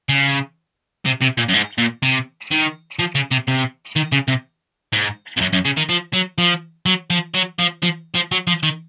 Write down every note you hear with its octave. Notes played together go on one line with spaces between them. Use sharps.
C#3
C3
C3
A#2
F#2
G#2
A#2
C3
D#3
F3
C#3
C3
C3
D#3
C#3
C3
G#2
F2
F#2
F#2
C#3
D#3
F3
F#3
F3
F#3
F3
F#3
F3
F3
F3
F#3
F3
D#3